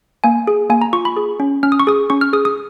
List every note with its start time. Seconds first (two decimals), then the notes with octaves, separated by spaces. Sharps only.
0.24 A#3 G#5
0.47 G#4
0.70 A#3 G#5
0.82 A#5
0.93 F4 C#6
1.05 B5
1.17 G#4
1.40 C#4
1.63 C#4 F6
1.72 D#6
1.80 C#6
1.87 G#4 D#6
2.10 C#4 C#6
2.21 F6
2.33 G#4 D#6
2.45 D#6